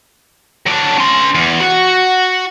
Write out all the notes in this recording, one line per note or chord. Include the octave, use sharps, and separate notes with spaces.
F#3 D4
C#4 C6
E2
F#4 F#5